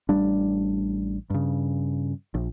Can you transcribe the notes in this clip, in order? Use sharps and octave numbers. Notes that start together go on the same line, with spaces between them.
A1 G3 D4
G2 C#3
A#1